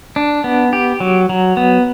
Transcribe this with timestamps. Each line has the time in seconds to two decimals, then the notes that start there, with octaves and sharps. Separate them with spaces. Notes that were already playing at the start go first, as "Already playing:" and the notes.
0.16 D4
0.44 B3
0.73 G4
1.00 F#3
1.29 F#3
1.57 B3